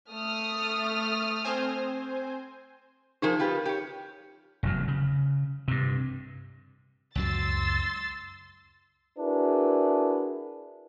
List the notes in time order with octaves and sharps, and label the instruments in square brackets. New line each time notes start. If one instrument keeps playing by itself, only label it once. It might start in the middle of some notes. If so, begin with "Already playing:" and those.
[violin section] A3 D#6 F6
[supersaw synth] C4 C5 G#5
[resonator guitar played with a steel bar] F3 G#4 C5 [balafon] D#4 A#4
[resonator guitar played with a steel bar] F4 G4 B4
G4 C#5
[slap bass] F1 E2 F#3
C#3
G2 C3
[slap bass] C#2 F#2 F#3 [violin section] C6 E6 A6
[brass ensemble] D4 E4 F#4 G#4 A#4 B4